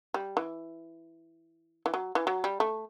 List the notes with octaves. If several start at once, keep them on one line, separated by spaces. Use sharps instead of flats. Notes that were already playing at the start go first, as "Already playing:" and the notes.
G3
E3
E3
F#3
E3
F#3
G3
A3